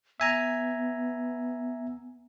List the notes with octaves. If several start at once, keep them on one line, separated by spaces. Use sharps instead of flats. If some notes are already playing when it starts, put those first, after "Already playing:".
B3 E5 G#5 A#5